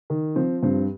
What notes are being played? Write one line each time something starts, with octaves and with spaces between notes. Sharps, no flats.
D#3
F3 C4
G2 C4